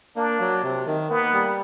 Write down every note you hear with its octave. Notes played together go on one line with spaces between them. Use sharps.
A#3 D4
F#3
C3
D#3
A#3 B3
G3